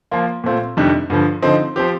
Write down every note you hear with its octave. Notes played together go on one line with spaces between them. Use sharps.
F3 A#3 F4
A#2 A3 C4 F4
F2 C3 D#3 G3 D4
G2 D3 F3
D3 F3 C4 D#4
F3 C4 G4